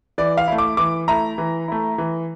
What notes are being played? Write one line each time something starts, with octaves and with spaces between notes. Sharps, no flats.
E3 D5
F5
A3 E4
D6
E3 D6
A3 E4 A#5
E3
A3 E4
E3